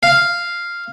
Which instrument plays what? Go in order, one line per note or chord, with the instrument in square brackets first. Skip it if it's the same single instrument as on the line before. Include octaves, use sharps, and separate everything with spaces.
[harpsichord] F5